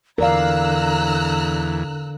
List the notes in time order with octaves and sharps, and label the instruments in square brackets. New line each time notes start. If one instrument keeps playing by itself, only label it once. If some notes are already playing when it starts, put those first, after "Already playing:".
[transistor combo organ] E2 [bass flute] D3 [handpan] A#4 D5 F5 [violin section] A#5 E6 F#6